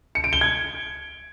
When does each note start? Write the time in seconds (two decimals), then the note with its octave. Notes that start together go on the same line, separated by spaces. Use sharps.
0.15 C#7
0.24 D7
0.33 G7
0.41 G#6